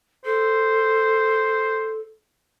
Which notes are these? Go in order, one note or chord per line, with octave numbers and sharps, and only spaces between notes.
A4 C5